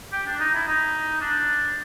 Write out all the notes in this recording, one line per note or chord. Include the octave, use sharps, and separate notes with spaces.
G4
D4
D#4
E4
D#4
D4